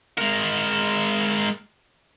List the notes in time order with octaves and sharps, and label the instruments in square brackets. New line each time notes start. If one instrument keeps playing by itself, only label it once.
[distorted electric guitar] G#3 A#4